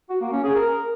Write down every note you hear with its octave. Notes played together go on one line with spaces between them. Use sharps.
F#4
A#3
C#4
G#4
A#4